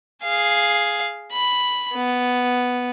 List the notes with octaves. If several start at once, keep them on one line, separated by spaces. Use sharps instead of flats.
G#4 F5
B5
B3